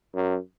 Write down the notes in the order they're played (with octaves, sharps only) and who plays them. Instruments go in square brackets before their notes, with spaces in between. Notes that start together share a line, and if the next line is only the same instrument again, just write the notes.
[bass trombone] F#2